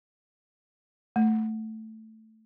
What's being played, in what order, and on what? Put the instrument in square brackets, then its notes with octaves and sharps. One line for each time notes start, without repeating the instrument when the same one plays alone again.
[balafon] A3